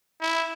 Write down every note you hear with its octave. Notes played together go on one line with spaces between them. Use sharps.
E4